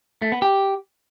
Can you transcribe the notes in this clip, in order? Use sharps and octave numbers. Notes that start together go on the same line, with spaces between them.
A3
B3
G4